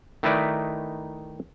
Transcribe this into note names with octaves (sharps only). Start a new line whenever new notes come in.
D#3 A3 D#4 E4 B4 D5